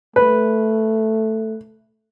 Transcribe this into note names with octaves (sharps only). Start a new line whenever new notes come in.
A3 B4